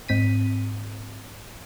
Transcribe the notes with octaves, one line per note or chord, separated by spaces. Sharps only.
G#2 C4 B6 D#7